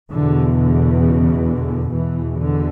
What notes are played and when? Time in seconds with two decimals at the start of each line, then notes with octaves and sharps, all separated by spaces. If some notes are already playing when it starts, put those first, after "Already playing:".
0.11 E2 B2 D3
0.56 D3
1.01 C#3
1.48 D3
1.92 E2 B2 E3
2.38 D3